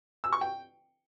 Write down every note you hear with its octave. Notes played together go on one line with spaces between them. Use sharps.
E6
C#6
G5